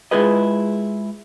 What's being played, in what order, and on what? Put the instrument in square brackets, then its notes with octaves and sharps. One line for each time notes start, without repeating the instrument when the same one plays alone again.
[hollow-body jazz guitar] G#3 E4 F4 G#4 B4 D#5